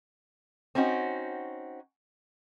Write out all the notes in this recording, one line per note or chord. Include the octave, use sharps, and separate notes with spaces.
C4 C#4 D#4 F#4